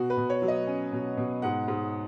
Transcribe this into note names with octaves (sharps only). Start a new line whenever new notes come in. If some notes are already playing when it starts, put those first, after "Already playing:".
Already playing: B2 F#4
B4
B2
C#5
F#3
D#5
C#4
B2
B2
G#2 F#5
G#2